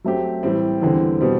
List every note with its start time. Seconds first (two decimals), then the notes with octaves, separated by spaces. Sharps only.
0.04 F#3 A3 C4 G4
0.43 A2 E3 G3 C4
0.82 E2 D3 G3 C4
1.21 B2 G3 C4